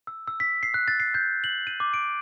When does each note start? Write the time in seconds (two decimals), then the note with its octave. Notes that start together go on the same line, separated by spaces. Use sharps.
0.07 E6
0.27 E6
0.40 B6
0.63 C7
0.74 F#6
0.88 A6
1.00 C7
1.14 G6
1.44 F#7
1.67 D#7
1.80 D6
1.94 D7